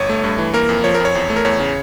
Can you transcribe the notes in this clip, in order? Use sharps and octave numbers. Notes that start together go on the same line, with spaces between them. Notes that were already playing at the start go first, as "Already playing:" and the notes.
Already playing: G1 C#5
A3
G2
E3
A#3 A#4
F2
F3 C#5
A#4
F2
C#5
E2
A3
A#4
E2 C#5
C#3